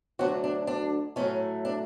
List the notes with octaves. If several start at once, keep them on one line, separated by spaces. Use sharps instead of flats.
D2 D3 F#3 A3 D4 F#4
D4
D4
A2 F#3 A3 C#4
D4